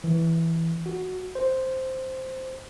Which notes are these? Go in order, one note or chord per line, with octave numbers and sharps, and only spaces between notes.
E3
F#4
C5